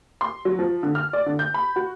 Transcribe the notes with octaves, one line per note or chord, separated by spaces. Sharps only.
C6
F#3
F3
D3
F6
D5
D3
G6
B5
F#4